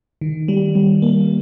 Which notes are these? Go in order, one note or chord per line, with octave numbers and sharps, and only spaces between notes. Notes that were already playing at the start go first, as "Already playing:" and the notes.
D#3
G3
G3
A#3